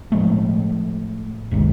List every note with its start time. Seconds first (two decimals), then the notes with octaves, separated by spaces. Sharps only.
0.12 A2 F3 G#3 A3
1.51 F#1 C2 D#3 G#3